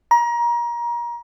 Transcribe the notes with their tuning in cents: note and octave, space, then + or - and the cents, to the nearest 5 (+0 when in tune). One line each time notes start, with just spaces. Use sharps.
A#5 +30